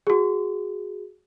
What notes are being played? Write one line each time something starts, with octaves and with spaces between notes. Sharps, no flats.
F#4 G#4